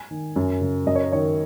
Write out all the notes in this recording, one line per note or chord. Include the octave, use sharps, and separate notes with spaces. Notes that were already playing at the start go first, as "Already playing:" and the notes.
Already playing: G#5
D#3
F#2
C#3
F#2 D#5
C#5
A#4
D#3 C#5